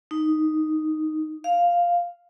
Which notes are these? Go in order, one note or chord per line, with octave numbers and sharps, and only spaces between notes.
D#4
F5